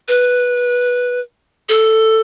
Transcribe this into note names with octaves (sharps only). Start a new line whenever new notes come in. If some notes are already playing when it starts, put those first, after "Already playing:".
B4
A4